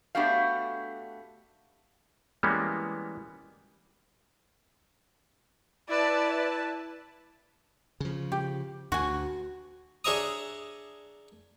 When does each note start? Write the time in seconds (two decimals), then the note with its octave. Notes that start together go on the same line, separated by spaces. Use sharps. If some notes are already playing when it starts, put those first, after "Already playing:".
0.15 A3 B3 D4 F#4 G4 F5
2.43 E3 G3 G#3 A#3 B3 C#4
5.89 E4 B4 D5 A5
8.00 C#3 F3
8.32 G4
8.92 D2 F#4 G#5
10.04 D4 G#4 C#5 E5 A#5 D#6